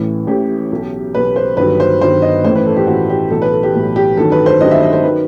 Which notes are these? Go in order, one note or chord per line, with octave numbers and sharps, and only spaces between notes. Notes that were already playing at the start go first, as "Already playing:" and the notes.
Already playing: A1 A2 E3
A1 A2 E3 G4
B1 B2 F#3
B1 B2 F#3 B4
C5
G1 G2 D#3 F#3 B4
C5
G1 G2 D#3 F#3 C5
D#5
A1 A2 E3 C5
B4
A4
G4
A1 A2 E3 F#4
G4
B1 A2 E3 A4
B4
A4
G4
B1 A2 E3
G4
A1 G2 D#3 F#3 A4
B4
C5
A1 G2 D#3 F#3 D#5
E5
D#5
C5
D#3 F#3 B4